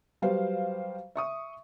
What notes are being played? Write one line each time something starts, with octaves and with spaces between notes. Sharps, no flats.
F#3 G3 B4 C5 F5
E5 C#6 D#6